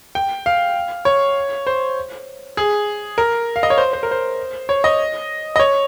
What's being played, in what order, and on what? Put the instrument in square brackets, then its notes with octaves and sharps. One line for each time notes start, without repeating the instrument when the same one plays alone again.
[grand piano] G5
F5
C#5
C5
G#4
A#4
F5
D#5
C#5
C5
C5
A#4
C5
C#5
D#5
D#5
C#5